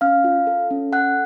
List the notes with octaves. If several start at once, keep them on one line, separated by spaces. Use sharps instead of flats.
C#4 F5 F6
F4
A4
C#4
A4 F#5 F#6